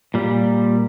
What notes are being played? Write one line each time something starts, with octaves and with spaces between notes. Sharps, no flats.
A#2 G3